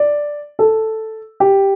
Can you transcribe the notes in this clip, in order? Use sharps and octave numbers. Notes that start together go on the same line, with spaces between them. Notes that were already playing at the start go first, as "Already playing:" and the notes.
Already playing: D5
A4
G4